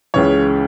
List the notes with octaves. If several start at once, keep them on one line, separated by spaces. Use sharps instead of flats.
C#2 C#3 E3 C#5